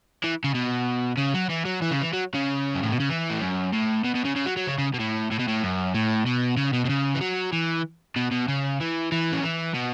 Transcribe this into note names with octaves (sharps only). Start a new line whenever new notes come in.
E3
C#3
B2
C#3
F#3
E3
F#3
E3
C#3
E3
F#3
C#3
F#2
A2
B2
C#3
E3
A2
F#2
A2
B2
B2
C#3
C#3
F#3
F#3
C#3
C#3
B2
A2
A2
B2
A2
F#2
A2
B2
C#3
B2
B2
C#3
E3
F#3
E3
B2
B2
C#3
E3
E3
C#3
E3
B2